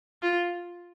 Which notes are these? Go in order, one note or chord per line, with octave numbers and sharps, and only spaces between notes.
F4